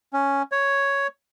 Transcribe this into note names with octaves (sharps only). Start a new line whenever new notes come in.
C#4
C#5